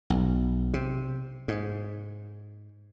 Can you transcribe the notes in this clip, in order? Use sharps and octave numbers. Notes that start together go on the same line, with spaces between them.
B1
C3
G#2